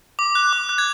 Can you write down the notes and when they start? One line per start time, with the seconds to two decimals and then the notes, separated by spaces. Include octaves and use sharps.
0.19 D6
0.35 F#6
0.53 D6
0.69 F#6
0.78 G#6